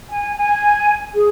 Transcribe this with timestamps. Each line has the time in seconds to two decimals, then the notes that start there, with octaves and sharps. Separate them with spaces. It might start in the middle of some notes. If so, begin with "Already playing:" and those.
0.09 G#5
0.35 G#5
1.14 G#4